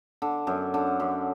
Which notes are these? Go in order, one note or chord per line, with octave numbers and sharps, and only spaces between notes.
D3
F#2
D3
F#2